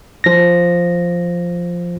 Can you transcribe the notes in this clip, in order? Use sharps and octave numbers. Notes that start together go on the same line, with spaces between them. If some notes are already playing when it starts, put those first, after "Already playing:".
F3 A#6